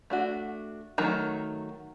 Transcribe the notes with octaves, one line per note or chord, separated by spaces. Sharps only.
A3 D4 F#4
D#3 F#3 A3